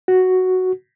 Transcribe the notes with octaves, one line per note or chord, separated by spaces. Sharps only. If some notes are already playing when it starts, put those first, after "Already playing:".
F#4